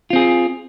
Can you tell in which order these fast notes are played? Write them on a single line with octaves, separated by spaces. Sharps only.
F4 C4 G#4